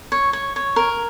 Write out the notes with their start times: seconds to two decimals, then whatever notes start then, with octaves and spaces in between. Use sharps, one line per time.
0.12 C#5
0.33 C#5
0.56 C#5
0.76 A#4